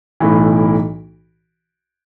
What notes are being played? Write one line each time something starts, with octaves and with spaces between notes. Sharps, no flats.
B1 A2 E3